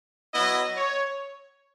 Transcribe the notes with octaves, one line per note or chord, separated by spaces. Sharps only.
F#3 B3 E4 D#5
C#5